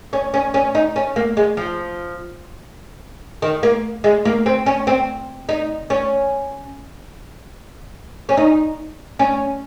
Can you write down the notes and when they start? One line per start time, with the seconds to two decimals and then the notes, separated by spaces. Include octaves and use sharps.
0.13 C#4
0.34 C#4
0.54 C#4
0.75 D#4
0.96 C#4
1.16 A#3
1.37 G#3
1.57 F3
3.42 D#3
3.63 A#3
4.04 G#3
4.25 A#3
4.46 C4
4.66 C#4
4.87 C4
5.49 D#4
5.90 C#4
8.29 C#4
8.37 D#4
9.19 C#4